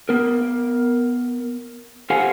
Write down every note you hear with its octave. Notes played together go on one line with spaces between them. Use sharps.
B3 A#4
G4 A4 C5 F5 F#5 G#5